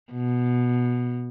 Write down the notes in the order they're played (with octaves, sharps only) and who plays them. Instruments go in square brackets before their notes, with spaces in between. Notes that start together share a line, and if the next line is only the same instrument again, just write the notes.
[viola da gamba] B2